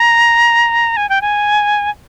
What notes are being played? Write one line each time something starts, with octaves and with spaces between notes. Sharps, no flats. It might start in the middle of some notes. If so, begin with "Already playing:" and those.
Already playing: A#5
G#5
G5
G#5